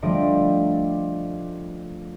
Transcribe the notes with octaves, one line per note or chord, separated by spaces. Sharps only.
F3 G3 A3 D4 D#5 D7